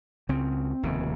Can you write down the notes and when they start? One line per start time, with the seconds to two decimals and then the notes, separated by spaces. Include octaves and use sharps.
0.29 C#2 C#3 C4
0.83 F1 D#2 C#3